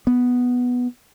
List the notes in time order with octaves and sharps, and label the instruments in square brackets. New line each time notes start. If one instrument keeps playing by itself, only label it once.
[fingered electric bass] B3